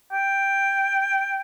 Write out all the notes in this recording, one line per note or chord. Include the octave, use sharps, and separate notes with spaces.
G5